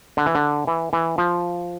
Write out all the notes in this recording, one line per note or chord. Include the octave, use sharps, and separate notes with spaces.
D3
E3
D3
E3
E3
F3